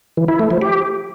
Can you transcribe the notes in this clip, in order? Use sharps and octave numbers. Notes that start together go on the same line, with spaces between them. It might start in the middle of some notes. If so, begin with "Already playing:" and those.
E3
E4
A3
F3
G4